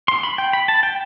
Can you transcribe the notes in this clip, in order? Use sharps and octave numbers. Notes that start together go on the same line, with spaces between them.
C6
B5
G5
B5
A5
G5